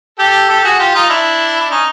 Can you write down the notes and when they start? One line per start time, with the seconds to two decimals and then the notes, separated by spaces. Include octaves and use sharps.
0.18 G4 A4
0.49 G4 A4
0.64 F#4 G#4
0.79 F4 G4
0.95 D#4 F4
1.10 D4 E4
1.61 E4
1.70 C#4 D#4